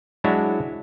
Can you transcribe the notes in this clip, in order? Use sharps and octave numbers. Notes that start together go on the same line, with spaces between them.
F#3 G#3 D4 E4 F#4 C#5